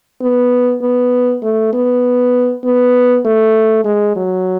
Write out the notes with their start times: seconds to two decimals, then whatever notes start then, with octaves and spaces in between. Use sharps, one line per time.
0.21 B3
0.82 B3
1.43 A3
1.73 B3
2.64 B3
3.25 A3
3.85 G#3
4.16 F#3